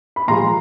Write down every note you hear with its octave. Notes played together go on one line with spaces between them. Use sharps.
B5
A#2 F3 G#3 A#5 C6